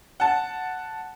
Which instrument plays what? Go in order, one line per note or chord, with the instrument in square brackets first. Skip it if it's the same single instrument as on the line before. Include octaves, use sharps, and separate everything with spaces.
[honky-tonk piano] F#5 A5